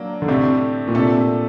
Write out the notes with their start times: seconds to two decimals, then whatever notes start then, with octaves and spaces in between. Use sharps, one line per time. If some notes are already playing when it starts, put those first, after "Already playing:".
Already playing: F#3 A#3 D4
0.22 D3
0.28 A2 C3 A3 D4 G4
0.87 A#2
0.95 C3 A3 D4 A4